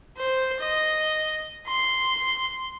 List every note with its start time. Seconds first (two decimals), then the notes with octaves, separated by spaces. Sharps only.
0.18 C5
0.59 D#5
1.67 C6